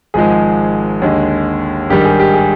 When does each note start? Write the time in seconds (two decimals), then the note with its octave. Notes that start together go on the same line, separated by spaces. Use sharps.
0.14 G#1 G#2 F3 G#3 G#4
1.02 D#2 D3 G#3
1.90 G#1 G2 D#3 G3 G4
2.05 G#4
2.20 G4
2.34 G#4